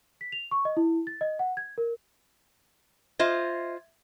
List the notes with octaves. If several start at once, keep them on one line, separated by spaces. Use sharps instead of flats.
B6
F7
C#6
D#5
E4
A6
D#5
F#5
G#6
A#4
F4 C5 D#5 E5 G#6